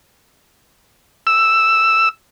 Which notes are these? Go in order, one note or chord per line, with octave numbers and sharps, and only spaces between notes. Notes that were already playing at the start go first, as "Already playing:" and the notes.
E6